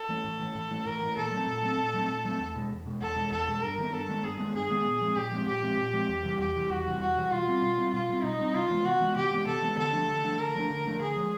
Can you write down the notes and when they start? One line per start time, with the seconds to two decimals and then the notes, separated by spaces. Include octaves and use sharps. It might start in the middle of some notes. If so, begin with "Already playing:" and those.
Already playing: A4
0.09 E3 A3
0.25 A2
0.39 E3 A3
0.55 A2
0.71 E3 A3
0.86 A2 A#4
1.01 E3 A3
1.17 A#2 A4
1.32 F#3 A3 C4
1.47 A#2
1.62 F#3 A3 C4
1.78 A#2
1.94 F#3 A3 C4
2.09 A#2
2.25 F#3 A3 C4
2.40 E2
2.56 B2 G#3
2.70 E2
2.86 B2 G#3
3.01 E2 A4
3.16 B2 G#3
3.31 E2 A4
3.47 B2 G#3
3.62 G2 A#4
3.78 D#3 G#3 B3
3.93 G2 A4
4.09 D#3 G#3 B3
4.24 G2 G#4
4.39 D#3 G#3 B3
4.54 G2 G#4
4.70 D#3 G#3 B3
4.86 A#2
5.02 F3 G#3 C4
5.17 A#2 G4
5.32 F3 G#3 C4
5.47 A#2 G4
5.63 F3 G#3 C4
5.77 A#2
5.93 F3 G#3 C4
6.09 E2
6.23 C3 E3 G3
6.39 E2 G4
6.55 C3 E3 G3
6.70 E2 F#4
6.86 C3 E3 G3
7.00 E2 F#4
7.17 C3 E3 G3
7.31 B2 F4
7.48 G3 C4
7.62 B2
7.78 G3 C4
7.94 B2 F4
8.09 G3 C4
8.24 B2 D#4
8.39 G3 C4
8.55 C3 F4
8.70 E3 G#3 B3
8.85 C3 F#4
9.01 E3 G#3 B3
9.16 C3 G4
9.31 E3 G#3 B3
9.47 C3 A4
9.62 E3 G#3 B3
9.78 D3 A4
9.93 F3 A3 D4
10.08 D3
10.24 F3 A3 D4
10.39 D3 A#4
10.55 F3 A3 D4
10.70 D3
10.85 F3 A3 D4
11.01 D3 G#4
11.16 F3 G#3